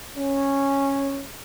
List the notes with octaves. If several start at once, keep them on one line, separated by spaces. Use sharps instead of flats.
C#4